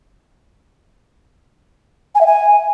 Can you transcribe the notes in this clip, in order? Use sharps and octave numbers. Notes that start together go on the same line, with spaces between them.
G#5
E5
G#5